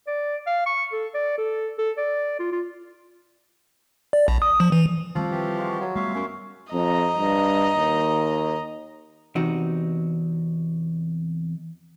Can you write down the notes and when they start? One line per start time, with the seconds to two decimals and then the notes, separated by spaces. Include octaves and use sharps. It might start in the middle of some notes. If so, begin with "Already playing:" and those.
0.07 D5
0.47 F5
0.66 C#6
0.92 A4
1.15 D5
1.38 A4
1.78 A4
1.98 D5
2.40 F4
2.52 F4
4.13 D5
4.28 A#1
4.42 D#6
4.60 F3
4.72 E3
5.15 D#3 F3 G3 C4 A4 C#6 D6
5.31 E3 G4
5.58 G#3 F4 F#4
5.80 F#3
5.95 G3 A3 B3 C#5 E5 F5 C6 C#6
6.14 F#2 C#4 C6
6.73 F2 D#5 A#5
7.18 G2
7.77 D#2
9.35 E2 C3 C4 D#4 F#4